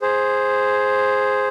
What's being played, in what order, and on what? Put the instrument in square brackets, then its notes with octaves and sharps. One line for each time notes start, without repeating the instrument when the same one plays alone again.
[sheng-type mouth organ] G#4 C5